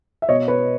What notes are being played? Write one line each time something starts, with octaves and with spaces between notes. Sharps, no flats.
E5
B2 C#5 D#5
B4 C#5